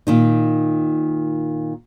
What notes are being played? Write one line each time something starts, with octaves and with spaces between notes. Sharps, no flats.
A#2 D#3 D#4